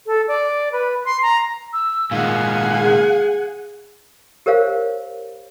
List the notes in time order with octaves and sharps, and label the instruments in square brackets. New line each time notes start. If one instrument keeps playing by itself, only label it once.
[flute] A4
D5
B4
C6
A#5
[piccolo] E6
[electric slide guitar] A#2 D#3 G#3 [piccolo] F5 [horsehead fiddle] F#5 G#5
[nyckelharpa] G#4
[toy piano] G4 A#4 C5 C#5 F5